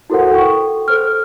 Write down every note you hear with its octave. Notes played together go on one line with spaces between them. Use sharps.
E4 F#4 A4 A#4 C5 F#5
A4 G5 C#6
A4 C5 F6